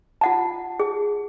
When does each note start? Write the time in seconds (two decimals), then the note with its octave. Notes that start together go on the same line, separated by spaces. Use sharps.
0.21 F4 F#5 A5
0.80 G#4